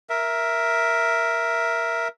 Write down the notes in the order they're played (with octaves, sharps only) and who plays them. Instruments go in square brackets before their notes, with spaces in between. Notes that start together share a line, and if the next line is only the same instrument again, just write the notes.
[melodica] A#4 E5